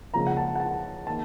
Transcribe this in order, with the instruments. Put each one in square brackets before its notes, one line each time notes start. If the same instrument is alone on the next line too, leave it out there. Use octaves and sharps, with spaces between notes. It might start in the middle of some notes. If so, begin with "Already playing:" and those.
[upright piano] C#2 C#3 F3 A#3 A#5
F#5
A5
F#5
A5
D#3 A#3 A5